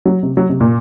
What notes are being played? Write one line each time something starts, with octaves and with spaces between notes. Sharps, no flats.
F#3
C3
F#3
C3
A#2